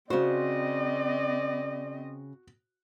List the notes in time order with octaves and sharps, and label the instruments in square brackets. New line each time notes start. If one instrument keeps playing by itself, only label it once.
[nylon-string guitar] C#3 C5 [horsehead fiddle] C4 D#5 [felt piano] F#4 [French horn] D5